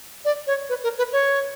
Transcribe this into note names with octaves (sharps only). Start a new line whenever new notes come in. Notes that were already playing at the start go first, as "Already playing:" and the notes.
D5
C#5
B4
A#4
B4
C#5